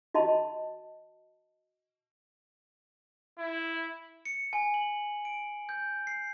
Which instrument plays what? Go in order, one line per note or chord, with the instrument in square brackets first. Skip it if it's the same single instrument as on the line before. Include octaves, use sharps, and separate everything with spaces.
[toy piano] F#4 D#5 A5 B5
[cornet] E4
[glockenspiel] C#7
G#5
F#7
D7
G6
C7